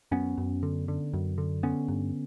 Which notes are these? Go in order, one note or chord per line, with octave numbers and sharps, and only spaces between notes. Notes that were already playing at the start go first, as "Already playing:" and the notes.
F#2 B3 C#4
F#2
D3
D3
F#2
D3
D3 B3 C#4
G2